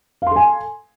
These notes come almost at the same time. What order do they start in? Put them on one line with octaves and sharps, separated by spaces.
F5 C6 A4 G#5